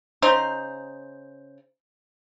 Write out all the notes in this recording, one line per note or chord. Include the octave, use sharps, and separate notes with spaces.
C#3 D#4 C5